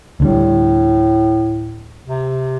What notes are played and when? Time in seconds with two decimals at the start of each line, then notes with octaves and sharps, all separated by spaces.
0.20 D2 A2 D3 G3
2.07 C3